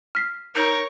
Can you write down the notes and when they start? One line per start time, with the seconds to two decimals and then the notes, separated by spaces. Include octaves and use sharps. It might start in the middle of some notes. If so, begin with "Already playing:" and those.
0.15 F6 B6 C7
0.55 D#4 A#4 C#5